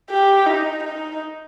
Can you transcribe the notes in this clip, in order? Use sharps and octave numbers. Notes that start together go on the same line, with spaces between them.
G4
D#4
D#4